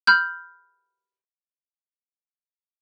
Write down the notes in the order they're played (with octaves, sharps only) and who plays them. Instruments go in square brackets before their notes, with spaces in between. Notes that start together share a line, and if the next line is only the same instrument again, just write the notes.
[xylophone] B5 F6 G6